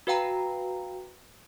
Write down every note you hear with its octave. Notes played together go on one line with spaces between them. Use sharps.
F#4 B4 F5 G5 A#5